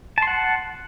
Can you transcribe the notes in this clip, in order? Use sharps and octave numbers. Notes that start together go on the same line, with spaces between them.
F#5 A5 C6